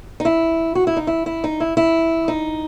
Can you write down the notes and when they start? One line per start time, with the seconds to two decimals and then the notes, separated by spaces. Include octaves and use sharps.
0.20 D#4
0.25 E4
0.75 F#4
0.87 E4
0.96 D#4
1.07 E4
1.26 E4
1.44 D#4
1.60 E4
1.77 E4
2.28 D#4